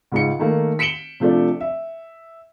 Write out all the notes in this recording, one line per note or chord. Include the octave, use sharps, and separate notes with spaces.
C#2 G#2 C#7
D#3 A3 A#3
B6 C#7 D7 E7 F#7 G7
C3 F3 A3 D4
E5